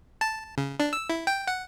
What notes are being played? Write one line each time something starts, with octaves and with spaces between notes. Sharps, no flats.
A5
C#3
D4
E6
E4
G5
F#5